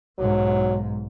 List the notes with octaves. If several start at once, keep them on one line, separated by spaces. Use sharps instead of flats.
B1 G#2 F#3